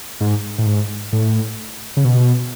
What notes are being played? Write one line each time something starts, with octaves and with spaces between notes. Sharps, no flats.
G#2
A2
G#2
A2
C#3
B2